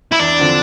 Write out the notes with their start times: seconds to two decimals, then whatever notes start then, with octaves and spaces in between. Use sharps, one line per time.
0.12 E4
0.19 E2 D4
0.38 D3 F3 C4